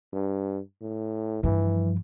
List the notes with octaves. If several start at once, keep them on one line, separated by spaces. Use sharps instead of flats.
G2
A2
G2 E3 F3